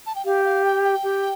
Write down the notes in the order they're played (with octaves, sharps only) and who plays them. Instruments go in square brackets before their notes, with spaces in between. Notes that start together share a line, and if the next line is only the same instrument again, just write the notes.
[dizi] A5
G5
[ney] G4 [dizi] F5
[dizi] F5
G5
G5
[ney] G4